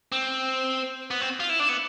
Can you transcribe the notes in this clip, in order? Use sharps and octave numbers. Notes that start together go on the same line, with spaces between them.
C4
B3
C4
F4
E4
D4
B3